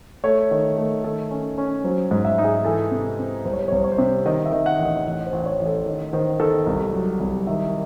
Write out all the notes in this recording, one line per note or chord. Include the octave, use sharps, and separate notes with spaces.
A3 C#5
D#3
A3
D#3 A4
C#4
C#4
F#3 C5
G#2
E5
D#4
G#4
E3 A4
C3
C4
C2 C5
C#5
C5
C#5
C2 C5
C#5
C5
C3
D#3 D#5
E5
D#3
F#5
A1
D#5
A1
C5
A1
C#5
A1
A4
D#3
D#3 C5
D#3 A4
C2 A4
F#3
C2
D#3 E5